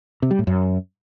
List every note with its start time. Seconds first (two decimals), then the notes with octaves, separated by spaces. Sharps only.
0.22 C3
0.31 G3
0.39 A2
0.47 F#2